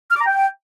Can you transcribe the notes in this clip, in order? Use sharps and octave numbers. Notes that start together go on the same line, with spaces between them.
F6
D6
A#5
G5